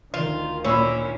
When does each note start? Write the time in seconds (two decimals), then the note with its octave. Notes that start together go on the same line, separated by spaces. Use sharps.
0.14 D2 D#3 F4
0.64 A#2 C#4 E4 B5 E6